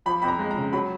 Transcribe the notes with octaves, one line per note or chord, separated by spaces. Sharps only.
F3 B5
F2 B5
A#5
G#3
A#5
C#3
F#3 B5